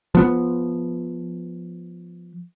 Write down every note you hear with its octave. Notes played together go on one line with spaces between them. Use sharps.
F3 B3